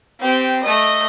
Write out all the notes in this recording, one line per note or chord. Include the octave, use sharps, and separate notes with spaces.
C4 G4
A3 D#5